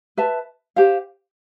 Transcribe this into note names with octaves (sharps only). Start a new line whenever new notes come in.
B4 E5 A5
G4 C5 F5